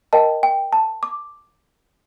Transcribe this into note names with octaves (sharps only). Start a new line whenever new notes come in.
A#4 D#5 G5 A5
G5
A5
D6